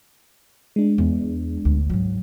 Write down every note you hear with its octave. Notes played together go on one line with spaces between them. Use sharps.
G#3 D4
E2
D2
G#2 F#3